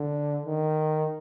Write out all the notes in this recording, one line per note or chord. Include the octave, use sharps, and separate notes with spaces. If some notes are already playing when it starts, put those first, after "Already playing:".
Already playing: D3
D#3